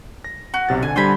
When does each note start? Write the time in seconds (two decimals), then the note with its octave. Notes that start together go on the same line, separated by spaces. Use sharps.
0.24 A#6
0.54 F#4
0.69 B1 C3 A6
0.82 D3 G#5
0.96 D3 G3 D4 C5 G#5 B5